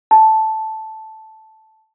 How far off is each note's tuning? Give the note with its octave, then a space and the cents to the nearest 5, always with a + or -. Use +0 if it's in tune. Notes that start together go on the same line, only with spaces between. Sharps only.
A5 -5